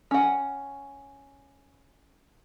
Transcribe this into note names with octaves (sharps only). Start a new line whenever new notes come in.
C#4 F#5